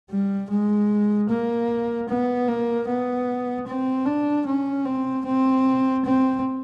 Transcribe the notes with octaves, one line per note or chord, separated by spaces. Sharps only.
G3
G#3
A#3
B3
A#3
B3
C4
D4
C#4
C4
C4
C4